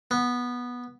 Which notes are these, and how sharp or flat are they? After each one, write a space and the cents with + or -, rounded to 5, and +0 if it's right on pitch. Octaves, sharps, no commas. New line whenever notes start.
B3 -10